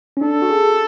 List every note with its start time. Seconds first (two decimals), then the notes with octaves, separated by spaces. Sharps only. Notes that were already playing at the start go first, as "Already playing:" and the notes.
0.17 C#4
0.21 D4 A4
0.42 F#4
0.50 G#4